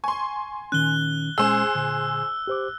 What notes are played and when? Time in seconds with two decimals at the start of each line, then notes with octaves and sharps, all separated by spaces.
0.04 G#5 C6 C#6
0.72 A#2 D#3 C#4 F#6 G7
1.38 A#2 G#3 C#4 G#4 C5 E6
1.75 A#2 D3
2.47 G4 C5 D6